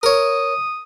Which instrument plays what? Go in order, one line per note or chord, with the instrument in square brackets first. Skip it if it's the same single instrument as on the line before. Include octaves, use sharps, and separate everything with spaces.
[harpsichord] A#4 C#5 [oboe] D#6